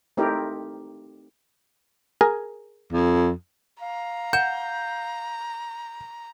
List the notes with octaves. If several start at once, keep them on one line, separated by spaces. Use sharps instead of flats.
A3 C4 D#4 E4 G4 A#4
G#4 A#4 G#5
F2
F5 A#5
F#5 G6 E7